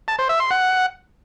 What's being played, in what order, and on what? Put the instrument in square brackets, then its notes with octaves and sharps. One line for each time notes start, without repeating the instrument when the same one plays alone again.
[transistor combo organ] A5
C5
E5
C6
F#5